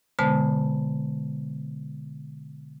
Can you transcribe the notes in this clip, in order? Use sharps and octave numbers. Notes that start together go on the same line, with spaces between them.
B2 D3 G#3 B3 C5 A5